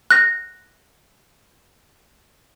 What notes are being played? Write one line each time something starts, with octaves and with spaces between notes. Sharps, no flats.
F#6 A#6